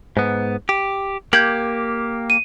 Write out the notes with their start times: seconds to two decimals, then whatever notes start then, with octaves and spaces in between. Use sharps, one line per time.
0.17 G#2 B3
0.69 G4
1.33 A#3 G4 G6 G#6 F#7
2.30 D#7